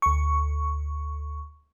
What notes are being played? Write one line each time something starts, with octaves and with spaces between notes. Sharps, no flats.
D2 C#6